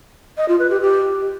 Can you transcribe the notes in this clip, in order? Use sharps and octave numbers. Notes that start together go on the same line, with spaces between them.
D#5
F4
B4
G4
G4